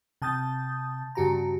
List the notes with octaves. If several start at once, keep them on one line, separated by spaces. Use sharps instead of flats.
C3 A5 D#6 G6 A6
G2 C#3 F#4 G4 A5 A#5